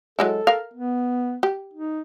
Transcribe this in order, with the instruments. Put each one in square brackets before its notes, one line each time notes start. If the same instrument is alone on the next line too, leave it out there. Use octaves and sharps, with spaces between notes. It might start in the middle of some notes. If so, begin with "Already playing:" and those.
[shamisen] F#3 G#3 E4 [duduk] A4
[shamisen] A#4 F5
[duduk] B3
[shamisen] G4
[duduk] D#4